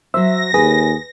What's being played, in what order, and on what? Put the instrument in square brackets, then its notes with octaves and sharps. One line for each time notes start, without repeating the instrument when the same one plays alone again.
[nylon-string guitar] F#3 C5 [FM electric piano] E5 [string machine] A#6
[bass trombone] D#2 [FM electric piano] G#4 [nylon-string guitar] B4